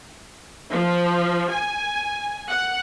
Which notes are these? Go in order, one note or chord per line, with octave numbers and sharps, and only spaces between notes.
F3
G#5
F#5